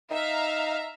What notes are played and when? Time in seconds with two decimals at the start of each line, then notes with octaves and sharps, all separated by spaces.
0.11 D#4 E5 F5 A#5